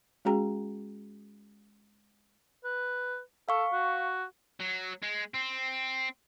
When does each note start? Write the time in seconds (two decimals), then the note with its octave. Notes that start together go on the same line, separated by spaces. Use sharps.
0.25 G#3 C#4 F#4 G#4 G5 A#5
2.64 B4
3.49 A4 F5 C#6
3.73 F#4
4.60 F#3
5.03 G#3
5.34 C4